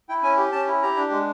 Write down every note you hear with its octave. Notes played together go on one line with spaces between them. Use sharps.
E4 G5
C#4 G#5
G4
C#4 A5
E4
G4 A#5
D4
G#3